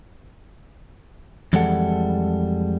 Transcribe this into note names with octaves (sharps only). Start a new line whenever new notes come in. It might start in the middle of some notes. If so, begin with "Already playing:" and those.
F2 E3 G3 G#3 A4 F#5